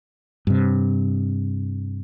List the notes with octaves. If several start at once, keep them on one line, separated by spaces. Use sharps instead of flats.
G2 C3